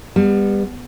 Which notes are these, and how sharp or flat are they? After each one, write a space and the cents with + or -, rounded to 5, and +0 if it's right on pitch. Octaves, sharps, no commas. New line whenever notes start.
G3 +30 B3 +0